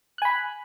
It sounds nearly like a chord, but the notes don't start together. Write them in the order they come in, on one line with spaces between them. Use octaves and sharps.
F#6 G#5 B5